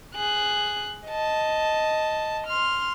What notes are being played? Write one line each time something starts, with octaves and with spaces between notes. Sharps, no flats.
G#4 F#6
D#5 A5
C6 F6